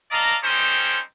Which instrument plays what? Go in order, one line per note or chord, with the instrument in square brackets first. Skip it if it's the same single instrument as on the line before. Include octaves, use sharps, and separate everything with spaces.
[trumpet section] D5 D#5 F5 A5 A#5
G3 C4 C#4 D#4 A4 C5